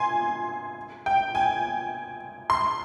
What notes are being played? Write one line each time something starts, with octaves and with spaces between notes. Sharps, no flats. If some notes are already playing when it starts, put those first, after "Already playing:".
Already playing: G#5 C6
G5
G#5
C6